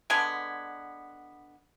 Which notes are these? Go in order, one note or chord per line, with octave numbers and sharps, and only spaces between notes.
D3 G#3 B3 G#5